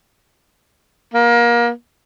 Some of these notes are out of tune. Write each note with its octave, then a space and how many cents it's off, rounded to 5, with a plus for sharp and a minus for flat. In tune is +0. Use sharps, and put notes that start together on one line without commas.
A#3 +25